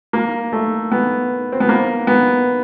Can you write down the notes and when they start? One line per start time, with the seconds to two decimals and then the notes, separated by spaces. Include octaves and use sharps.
0.13 A#3
0.53 A3
0.92 B3
1.52 C4
1.60 B3
1.69 A#3
2.07 B3